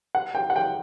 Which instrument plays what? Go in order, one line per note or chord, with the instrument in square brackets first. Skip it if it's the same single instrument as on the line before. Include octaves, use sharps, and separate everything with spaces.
[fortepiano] F#5
G5
F#5
G5